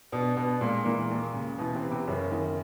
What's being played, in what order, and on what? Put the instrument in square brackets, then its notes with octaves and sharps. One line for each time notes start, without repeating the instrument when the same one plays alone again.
[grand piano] B2 B3 [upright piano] D4
[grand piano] B2 B3 [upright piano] D4
[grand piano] A#2 A#3 [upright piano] G#3
[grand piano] A#2 A#3 [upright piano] E3
[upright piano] D#2
C#3
[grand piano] B2 B3 [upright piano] E3
[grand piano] C3 C4
[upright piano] B3
[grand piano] C3 C4
[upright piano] F#2 [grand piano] C#3 C#4
[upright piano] D#3